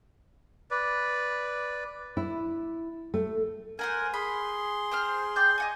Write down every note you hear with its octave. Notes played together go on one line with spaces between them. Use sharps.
B4 D5
E4
A3
A#4 C5 F#5 G#5
G#4 B5 C6
C4 C5 F6
D5 G5 G6
D#5 F#5 G#5